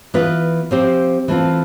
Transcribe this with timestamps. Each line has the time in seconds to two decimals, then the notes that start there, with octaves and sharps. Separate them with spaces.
0.14 E3 B3 F4 B4
0.71 F3 C4 G4 C5
1.28 E3 A3 C4 F4